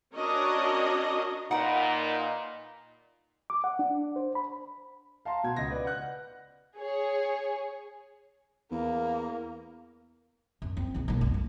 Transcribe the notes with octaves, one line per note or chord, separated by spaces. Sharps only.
C#4 D4 F#4 A#4 C#5 D#5
A#2 D#4 A#4 B4 F#5
D6
F#5
D4
C5
B5
F5 A5 A#5 C6
B2 G#6
C#2 D#5 A#6
B4 D5
F#5 F#6
G#4 C#5
E2 A#3
F#2
C4
A#1 E3
B1 A#3
F1 G2
D2